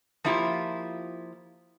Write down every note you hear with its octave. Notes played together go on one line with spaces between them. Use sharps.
F3 A#3 E4 F4 G4